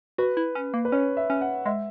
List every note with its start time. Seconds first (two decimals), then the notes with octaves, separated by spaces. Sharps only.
0.18 F#4 B4
0.37 E4
0.55 C#4
0.74 A#3
0.85 B4
0.92 C#4 C#5
1.17 E5
1.30 C#4
1.41 F#5
1.66 G#3 E5